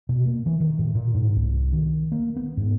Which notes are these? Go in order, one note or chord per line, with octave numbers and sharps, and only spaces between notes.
B2
A#3
E3
D#3
A2
A#2
G#2
C2
D#3
A#3
B3
G#2